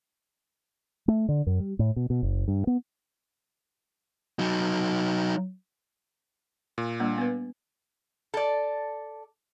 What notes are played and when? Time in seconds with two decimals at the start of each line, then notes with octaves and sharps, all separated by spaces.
1.08 A3
1.29 D3
1.47 F#2
1.60 G3
1.79 A2
1.96 B2
2.10 B2
2.23 F#1
2.48 G2
2.67 B3
4.39 F#3 D#4
6.78 A#2
7.00 G3 A#3 D4
7.18 B3 B4
8.34 A4 D5